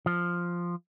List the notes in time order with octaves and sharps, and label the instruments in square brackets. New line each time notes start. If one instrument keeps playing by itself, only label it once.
[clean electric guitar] F3